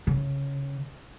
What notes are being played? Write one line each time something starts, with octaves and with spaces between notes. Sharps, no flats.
C#3